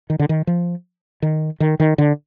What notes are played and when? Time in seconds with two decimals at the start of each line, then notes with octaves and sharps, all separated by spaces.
0.10 D#3
0.19 D3
0.29 D#3
0.47 F3
1.22 D#3
1.60 D#3
1.80 D#3
1.98 D3